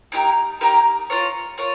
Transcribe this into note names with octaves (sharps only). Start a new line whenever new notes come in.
A#3 D#4 G4 A#4
A#3 D#4 G4 A#4
F4 A#4 C#5
F4 A#4 C#5